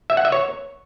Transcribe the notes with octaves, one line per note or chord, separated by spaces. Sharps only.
E5
F#5
E5
C#5